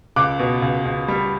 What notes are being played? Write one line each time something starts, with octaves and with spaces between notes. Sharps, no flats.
C#2 D6 F#6
B2
C#2
C#2
G3